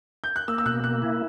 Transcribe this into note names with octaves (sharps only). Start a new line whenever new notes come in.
G6
F#6
A#3 E6
E6
B2 F#6
A#3 F#6
E4